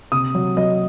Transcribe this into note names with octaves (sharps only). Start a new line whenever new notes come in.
C3 D#6
F#3
F#3 D#5